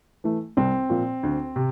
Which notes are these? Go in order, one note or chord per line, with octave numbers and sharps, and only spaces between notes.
E3 A3
C2 C4
A#2 F3
D2
C3